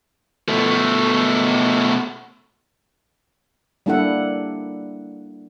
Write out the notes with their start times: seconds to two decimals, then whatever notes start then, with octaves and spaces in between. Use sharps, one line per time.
0.48 B2 A3
3.86 G3 A#3 D4 E4 A4 F#5